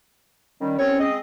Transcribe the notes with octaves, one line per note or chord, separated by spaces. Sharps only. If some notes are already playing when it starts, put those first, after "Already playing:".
D#3 G3 C#4
C2 C4 C#5
G#3 C4 D#5